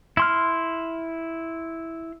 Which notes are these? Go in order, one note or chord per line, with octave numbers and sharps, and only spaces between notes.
E4 C6 F6